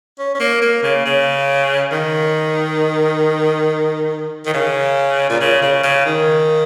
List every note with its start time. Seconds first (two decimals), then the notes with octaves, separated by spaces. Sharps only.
0.19 C#4
0.35 C#4
0.40 A#3
0.62 A#3
0.83 C#3
1.06 C#3
1.92 D#3
4.46 D#3
4.54 C#3
5.29 A#2
5.41 C#3
5.62 C#3
5.83 C#3
6.05 D#3